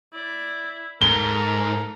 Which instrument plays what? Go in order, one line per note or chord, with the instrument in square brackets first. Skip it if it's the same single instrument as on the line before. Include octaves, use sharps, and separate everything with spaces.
[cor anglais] E4 [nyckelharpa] D5
[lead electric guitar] G#2 [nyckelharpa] A4 A#5 [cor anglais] A#4 [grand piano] G7